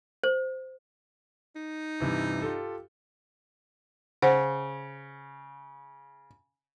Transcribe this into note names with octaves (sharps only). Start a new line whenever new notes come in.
C5
D#4
G2 C3 E3
F4 G4 A4
C#3 C5 F#5